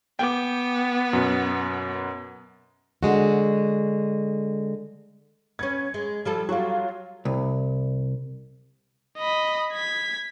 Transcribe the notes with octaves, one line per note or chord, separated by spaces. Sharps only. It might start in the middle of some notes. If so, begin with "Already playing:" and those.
B3 G5 D6
F#2 B2
D3 G#3 F#4
B3 C#4 G#6
G#3
F3 G3 A4
F#3 G3 F4 F#4
C2
D#5 B5
G#6 B6